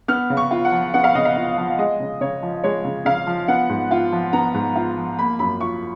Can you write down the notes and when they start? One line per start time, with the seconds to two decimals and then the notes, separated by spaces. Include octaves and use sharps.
0.08 B3 F6
0.30 C#3
0.37 C#6
0.51 F4
0.65 F#5
0.72 F3
0.94 B3 F#5
1.04 F5
1.15 C#3 D#5
1.25 F5
1.36 F4
1.57 F3
1.78 G#3 D#5
2.00 C#3
2.21 C#3 C#5
2.42 F3
2.64 G#3 C#5
2.84 C#3
3.05 C#3 F5
3.27 F3
3.48 B3 F#5
3.69 G#2
3.91 F4
4.12 F3
4.33 B3 A#5
4.54 G#2
4.76 F4
4.97 F3
5.19 A#3 B5
5.39 F#2 B5
5.60 F4 C#6